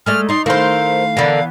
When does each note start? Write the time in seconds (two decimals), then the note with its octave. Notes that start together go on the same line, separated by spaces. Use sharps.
0.06 G#3 A3 D5 F6
0.29 D#4 D5 C6
0.46 D#3 A3 E4 A#4 C5 F5
1.17 D3 E3 B3 A#4